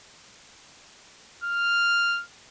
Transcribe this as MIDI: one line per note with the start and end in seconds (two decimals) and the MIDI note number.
1.44 2.23 89